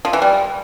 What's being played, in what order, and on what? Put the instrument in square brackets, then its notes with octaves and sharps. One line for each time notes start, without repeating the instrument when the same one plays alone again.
[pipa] F3
E3
G3